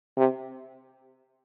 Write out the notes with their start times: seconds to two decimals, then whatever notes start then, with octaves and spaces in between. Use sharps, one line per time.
0.17 C3